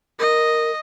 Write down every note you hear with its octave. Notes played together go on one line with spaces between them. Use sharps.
A#4 D#5